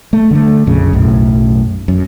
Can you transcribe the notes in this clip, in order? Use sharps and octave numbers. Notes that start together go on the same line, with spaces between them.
A3
D3 G#3 A3
A#1 F2 C#3
B1 F#2 A2
F#2